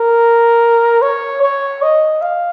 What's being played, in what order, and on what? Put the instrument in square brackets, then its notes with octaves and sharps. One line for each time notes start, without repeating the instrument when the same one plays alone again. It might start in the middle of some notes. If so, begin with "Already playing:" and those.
Already playing: [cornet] A#4
C#5
C#5
D#5
F5